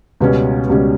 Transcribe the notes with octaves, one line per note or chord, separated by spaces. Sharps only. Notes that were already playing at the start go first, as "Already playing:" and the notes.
C#2 B2 G3 C#4 B4
C#2 B2 G3 C#4